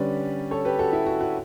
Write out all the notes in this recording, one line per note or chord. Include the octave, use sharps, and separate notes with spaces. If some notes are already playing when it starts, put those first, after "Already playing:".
Already playing: D3 G3 C#4 B4 D5
A4 C#5
G4 B4
F#4 A4
E4 G4
F#4
F#4